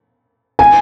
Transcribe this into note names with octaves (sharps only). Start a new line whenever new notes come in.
G#5